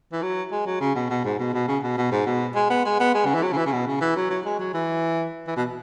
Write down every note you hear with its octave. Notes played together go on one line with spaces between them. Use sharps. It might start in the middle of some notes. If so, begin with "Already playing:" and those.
E3
F#3
G#3
F#3
C#3
B2
B2
G#2
B2
B2
C#3
B2
B2
G#2
B2
G#3
B3
G#3
B3
G#3
C#3
E3
F#3
C#3
E3
C#3
B2
C#3
E3
F#3
F#3
G#3
F#3
E3
E3
B2